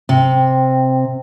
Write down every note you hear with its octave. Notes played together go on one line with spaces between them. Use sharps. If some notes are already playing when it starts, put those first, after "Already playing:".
C3 G5